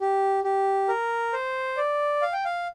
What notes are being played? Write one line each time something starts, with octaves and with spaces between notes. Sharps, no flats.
G4
G4
A#4
C5
D5
F5
G5
F5